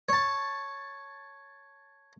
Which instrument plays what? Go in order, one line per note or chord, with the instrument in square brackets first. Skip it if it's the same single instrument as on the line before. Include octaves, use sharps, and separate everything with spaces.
[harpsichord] C#5 A5